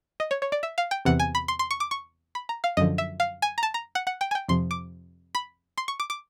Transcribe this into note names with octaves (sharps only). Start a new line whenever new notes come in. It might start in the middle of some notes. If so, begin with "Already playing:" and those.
D#5
C#5
C#5
D5
E5
F5
G5
E2 C3 E3 F#5
G#5
B5
C6
C6
C#6
D6
C#6
B5
A#5
F5
F#2 D3 F3 D#5
E5
F5
G#5
A#5
A5
A#5
F#5
F#5
G5
G#5
G5
F2 C3 F3 C6
D6
B5
C6
C#6
D6
D6